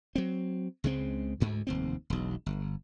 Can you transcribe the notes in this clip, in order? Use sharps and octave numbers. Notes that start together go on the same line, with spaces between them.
F#3 C4
C#2 C#3 G#3 C4
D2 G#2
F1 D#2 C4
E1 B1
G1